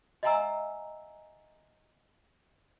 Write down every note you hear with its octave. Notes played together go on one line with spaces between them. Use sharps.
D#5 E5 F#5 G#5 A#5 E6